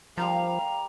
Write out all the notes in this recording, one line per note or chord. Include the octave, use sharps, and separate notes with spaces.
F3 G3 A#4 F5 A#5